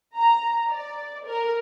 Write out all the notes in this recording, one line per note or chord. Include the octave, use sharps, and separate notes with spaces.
A#5
D5
A#4